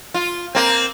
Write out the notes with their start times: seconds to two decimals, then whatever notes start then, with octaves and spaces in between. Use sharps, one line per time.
0.14 F4
0.55 A#3 C4